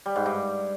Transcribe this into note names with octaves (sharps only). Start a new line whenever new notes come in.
G3
G#2
G2